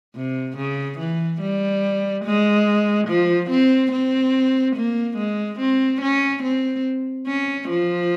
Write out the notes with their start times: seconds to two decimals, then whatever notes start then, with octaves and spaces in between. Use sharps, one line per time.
0.15 C3
0.57 C#3
0.99 E3
1.41 G3
2.25 G#3
3.08 F3
3.50 C4
3.92 C4
4.76 A#3
5.17 G#3
5.60 C4
6.01 C#4
6.43 C4
7.27 C#4
7.69 F3